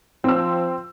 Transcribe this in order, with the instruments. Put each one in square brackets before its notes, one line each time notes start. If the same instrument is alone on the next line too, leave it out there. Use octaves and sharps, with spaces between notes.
[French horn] F3 [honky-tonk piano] C4 E6